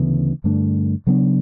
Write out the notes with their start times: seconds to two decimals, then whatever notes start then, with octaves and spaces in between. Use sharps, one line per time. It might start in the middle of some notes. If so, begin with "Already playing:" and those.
Already playing: D2 C#3 E3 B3
0.44 G2 D3 A3 D4
1.07 C#3 F#3 B3 D4